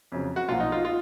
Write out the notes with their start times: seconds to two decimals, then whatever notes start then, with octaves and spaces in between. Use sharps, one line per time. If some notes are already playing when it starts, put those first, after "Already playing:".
0.12 F2 C#3 F#3
0.36 F#4
0.48 B1 A#2 F3 F4
0.60 D#4
0.72 F4
0.85 F4